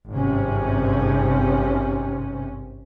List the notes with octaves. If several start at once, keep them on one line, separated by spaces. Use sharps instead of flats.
G#1 G2 C3 C#4